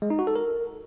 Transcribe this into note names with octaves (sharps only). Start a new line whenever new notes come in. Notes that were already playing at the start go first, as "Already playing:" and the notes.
G#3
D#4
F#4
A4
A#4